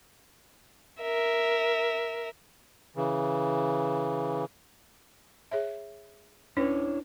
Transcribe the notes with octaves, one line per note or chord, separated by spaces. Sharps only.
A#4 E5
C#3 E3
G#4 C#5 E5
C#4 D4 E4 B4 C#5